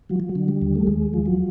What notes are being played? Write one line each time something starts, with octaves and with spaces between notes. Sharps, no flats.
F3 F#3
F3
F#3
D3
G3
D#2
A3
D#2 G#3
F3
F#3